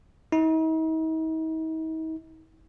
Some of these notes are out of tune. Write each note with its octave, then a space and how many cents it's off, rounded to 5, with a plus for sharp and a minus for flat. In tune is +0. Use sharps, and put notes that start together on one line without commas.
D#4 +45